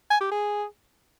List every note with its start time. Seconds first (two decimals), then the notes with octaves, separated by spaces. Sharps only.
0.10 G#5
0.21 G4
0.31 G#4